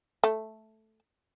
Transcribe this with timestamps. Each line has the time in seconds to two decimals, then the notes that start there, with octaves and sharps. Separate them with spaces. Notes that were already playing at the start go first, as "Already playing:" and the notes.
0.24 A3